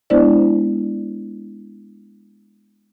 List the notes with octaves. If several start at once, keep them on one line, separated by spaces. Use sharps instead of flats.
G#3 B3 D4 E4 C5 D5